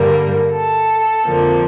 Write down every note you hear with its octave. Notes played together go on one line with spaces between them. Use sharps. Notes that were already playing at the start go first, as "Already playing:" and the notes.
Already playing: G2 D3 G3 A#3 A#4
A4
F2 D3 F3 A#3